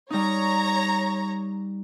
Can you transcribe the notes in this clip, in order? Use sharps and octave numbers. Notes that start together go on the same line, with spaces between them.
G3 D#4 C#5 A#5